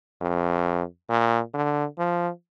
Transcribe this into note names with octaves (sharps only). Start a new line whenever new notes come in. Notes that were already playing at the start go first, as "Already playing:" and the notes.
F2
A#2
D3
F3